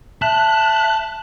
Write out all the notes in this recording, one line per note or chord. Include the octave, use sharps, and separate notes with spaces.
E5 A5 F#6